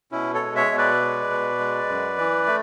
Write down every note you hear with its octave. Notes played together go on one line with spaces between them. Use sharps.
B2 C#4 E4
A4 C#5
G#3
C#5 E5
B2
B4 D5
G#3
B2
G#3
F#2
E3
A3